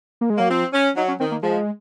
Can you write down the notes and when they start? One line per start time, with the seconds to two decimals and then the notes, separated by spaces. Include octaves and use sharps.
0.21 A#3
0.30 G#3
0.38 F#3 A#3
0.50 F3 C4
0.73 C#4
0.96 F#3 D#4
1.08 C#4
1.20 D#3 C4
1.31 A#3
1.43 F3 G#3